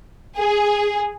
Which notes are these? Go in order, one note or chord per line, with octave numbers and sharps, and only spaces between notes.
G#4